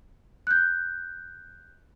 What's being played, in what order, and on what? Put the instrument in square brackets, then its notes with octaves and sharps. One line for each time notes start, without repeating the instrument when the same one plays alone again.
[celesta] F#6 G6